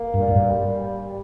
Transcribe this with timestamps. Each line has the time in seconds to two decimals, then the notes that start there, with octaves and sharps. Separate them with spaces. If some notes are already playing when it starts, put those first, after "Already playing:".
Already playing: A#3
0.14 G2
0.20 A#2
0.28 G#2
0.35 G2
0.48 G3